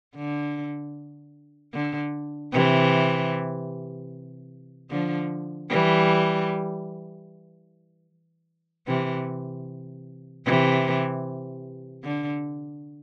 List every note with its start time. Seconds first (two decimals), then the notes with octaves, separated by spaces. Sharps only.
0.15 D3
1.73 D3
2.52 C3 E3
4.90 D3 F3
5.70 E3 G3
8.87 C3 E3
10.46 C3 E3
12.04 D3